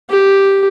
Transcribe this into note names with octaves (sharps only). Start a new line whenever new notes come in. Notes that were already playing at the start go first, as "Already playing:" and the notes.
G4